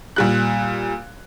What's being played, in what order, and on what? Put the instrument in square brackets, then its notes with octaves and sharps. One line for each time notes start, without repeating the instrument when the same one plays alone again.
[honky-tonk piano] A#2 G3 F#6